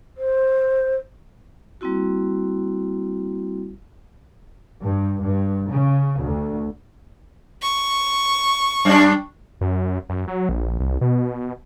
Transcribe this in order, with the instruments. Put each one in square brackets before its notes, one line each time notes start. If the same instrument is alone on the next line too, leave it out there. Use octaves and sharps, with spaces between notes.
[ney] C5
[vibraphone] G3 A#3 C4 E4 F#4
[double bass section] G2
G2
C#3
D2
[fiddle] C#6
[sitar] F#2 G3 D4
[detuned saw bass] F#2
F#2
F#3
A#1
C2
B2